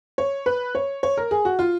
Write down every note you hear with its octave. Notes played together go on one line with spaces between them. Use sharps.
C#5
B4
C#5
C#5
A#4
G#4
F#4
F4